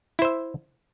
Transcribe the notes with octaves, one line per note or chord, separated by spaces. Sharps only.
E4 C5 E5